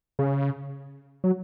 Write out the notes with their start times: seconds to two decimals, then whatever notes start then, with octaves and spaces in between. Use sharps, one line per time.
0.19 C#3
1.24 F#3